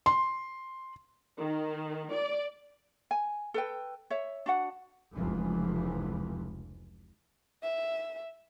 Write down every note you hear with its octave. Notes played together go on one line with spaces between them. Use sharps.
C6
D#3
D5
G#5
A4 B4 G5
C#5 E5
D4 F#4 F#5
F1 C#2 E3 F3
E5